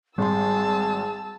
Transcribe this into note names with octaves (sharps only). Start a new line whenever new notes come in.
G#1 G3 G#4 A5 C6 E6